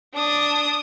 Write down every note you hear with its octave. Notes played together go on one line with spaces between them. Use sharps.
D4 D#6